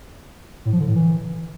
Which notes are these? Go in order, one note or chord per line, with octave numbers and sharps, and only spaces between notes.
A2
F3
D3
A2
E3